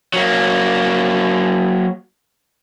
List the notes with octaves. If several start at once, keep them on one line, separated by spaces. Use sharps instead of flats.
F#3 A#3